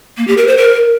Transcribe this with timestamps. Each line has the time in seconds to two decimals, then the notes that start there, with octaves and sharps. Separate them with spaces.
0.18 A#3
0.28 G4
0.37 A#4
0.47 C5
0.57 A#4